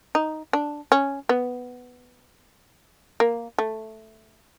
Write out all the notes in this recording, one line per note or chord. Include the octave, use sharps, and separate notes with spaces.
D#4
D4
C#4
B3
A#3
A3